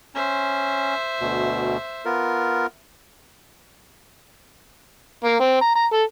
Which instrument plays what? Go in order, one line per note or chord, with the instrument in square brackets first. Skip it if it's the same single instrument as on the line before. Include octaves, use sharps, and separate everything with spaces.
[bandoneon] C#4 [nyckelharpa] C5 E5
[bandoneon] D2 B2
B3 F4 A#4
[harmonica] A#3
C4
A#5
A#5
A4